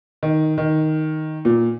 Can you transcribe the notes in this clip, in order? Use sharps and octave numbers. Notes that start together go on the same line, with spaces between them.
D#3
D#3
A#2